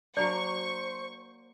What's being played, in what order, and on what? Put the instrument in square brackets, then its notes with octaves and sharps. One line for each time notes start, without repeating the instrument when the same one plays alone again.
[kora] F#3 A#3 D4 [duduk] C5 [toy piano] D5 [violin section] C#6